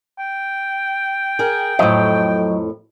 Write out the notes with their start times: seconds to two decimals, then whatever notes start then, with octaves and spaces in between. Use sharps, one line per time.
0.19 G5
1.39 G#4 A#4
1.79 F2 A2 F#3 D#5